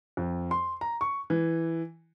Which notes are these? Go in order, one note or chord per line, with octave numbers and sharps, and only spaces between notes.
F2
C6
A#5
C#6
E3